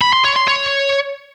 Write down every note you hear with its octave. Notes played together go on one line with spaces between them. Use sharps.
B5
C6
C#5
C6
C#5